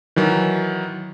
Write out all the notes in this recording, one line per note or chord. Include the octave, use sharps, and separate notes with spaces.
D#3 E3 F#3